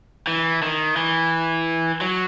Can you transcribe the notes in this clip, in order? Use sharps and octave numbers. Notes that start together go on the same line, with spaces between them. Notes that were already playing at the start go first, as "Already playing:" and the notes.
E3
D#3
E3
F#3